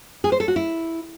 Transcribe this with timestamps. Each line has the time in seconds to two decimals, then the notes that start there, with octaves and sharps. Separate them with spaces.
0.24 G#4
0.32 C5
0.40 A4
0.48 F#4
0.56 E4